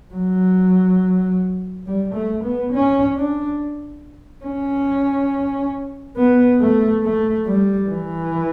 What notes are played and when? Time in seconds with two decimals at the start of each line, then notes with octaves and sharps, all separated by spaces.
0.14 F#3
1.86 G3
2.14 A3
2.43 B3
2.72 C#4
3.16 D4
4.44 C#4
6.17 B3
6.61 A3
7.04 A3
7.47 G3
7.89 E3